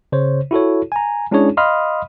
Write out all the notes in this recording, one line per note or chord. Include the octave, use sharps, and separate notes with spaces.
C#3 C5 C#5
E4 F#4 A4 C#5
G#5 A#5
G#3 C#4 D4 E4 G#4 C#5
D#5 F5 B5 C6 D#6 F6